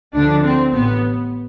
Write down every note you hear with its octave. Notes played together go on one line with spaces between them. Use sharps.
D2 D3 F3 D4
C4
A1 B3